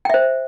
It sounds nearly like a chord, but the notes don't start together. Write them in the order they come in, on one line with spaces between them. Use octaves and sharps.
G5 E5 C5